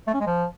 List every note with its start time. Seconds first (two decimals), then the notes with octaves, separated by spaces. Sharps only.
0.07 A3
0.14 C#4
0.20 G#3
0.27 F3